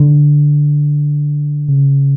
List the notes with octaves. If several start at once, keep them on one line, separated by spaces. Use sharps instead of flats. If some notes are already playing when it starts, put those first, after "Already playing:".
Already playing: D3
C#3